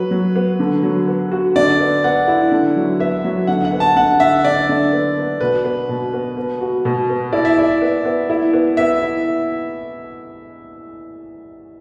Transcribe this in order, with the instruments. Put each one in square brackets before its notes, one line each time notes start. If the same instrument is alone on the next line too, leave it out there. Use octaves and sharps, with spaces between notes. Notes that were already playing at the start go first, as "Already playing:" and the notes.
Already playing: [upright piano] F#3 F#4 [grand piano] B4
[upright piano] F#3
B3
D3
F#3
B3
F#4
[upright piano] D3 [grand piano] D5
[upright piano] B3
[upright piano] B3 [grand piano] F#5
[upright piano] E4
D3
F#3
[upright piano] B3 [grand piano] E5
[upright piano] F#3
[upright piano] D3 [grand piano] F#5
[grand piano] F#5
[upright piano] B3
[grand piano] A5
[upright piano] D3 [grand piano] F#5
[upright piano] D3 [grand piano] E5
[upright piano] D3 [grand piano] D5
[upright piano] D3
B3
B3
[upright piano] B2 [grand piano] B4
[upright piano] B3
B2
B3
B3
F#4
B2
B3
[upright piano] E4 [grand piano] D5
[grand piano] E5
[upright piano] E4 [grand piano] D5
[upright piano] B3
B3
E4
B3
[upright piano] B3 [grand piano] E5
[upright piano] E4